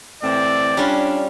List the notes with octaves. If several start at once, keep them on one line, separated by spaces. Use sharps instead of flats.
A2 E3 C4 D5
G3 C#4 D4 F4